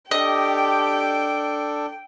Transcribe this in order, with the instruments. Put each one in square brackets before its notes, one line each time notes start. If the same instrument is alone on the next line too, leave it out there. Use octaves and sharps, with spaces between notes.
[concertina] D4 A4 [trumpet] G4 [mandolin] D#5 [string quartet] G5